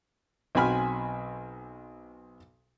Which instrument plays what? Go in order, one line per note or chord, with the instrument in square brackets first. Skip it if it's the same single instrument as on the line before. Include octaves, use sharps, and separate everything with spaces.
[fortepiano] B1 C4 F#4 G#5 B5 F6